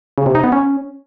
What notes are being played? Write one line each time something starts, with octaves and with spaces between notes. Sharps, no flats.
C#3
C3
D#4
B3
C#4